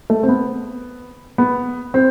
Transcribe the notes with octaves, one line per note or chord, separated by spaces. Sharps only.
A3
C4
B3
B3
C4